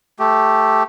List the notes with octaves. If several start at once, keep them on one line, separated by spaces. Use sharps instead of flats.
A3 G4